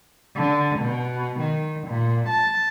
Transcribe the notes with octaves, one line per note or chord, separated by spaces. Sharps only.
D3
B2
D#3
A#2
A5